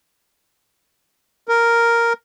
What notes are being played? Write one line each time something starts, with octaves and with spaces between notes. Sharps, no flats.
A#4